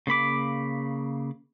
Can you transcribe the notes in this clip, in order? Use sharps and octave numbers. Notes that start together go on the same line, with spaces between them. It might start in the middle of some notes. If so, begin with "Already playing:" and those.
C#3 A#3 B5 D6